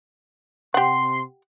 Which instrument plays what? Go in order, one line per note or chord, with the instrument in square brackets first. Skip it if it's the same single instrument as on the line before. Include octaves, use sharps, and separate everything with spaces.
[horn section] C3 C6 [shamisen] G4 F#5